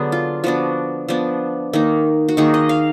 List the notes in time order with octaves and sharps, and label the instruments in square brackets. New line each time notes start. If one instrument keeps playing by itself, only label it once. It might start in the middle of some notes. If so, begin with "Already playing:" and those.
Already playing: [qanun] D3 F#3 B3 D4 G#4 B4
F4
F3 B3 D4 F#4
F3 B3 D4
D#3 A#3 D#4
F#4
D#3 A#3 D#4 G#4
D#5
F5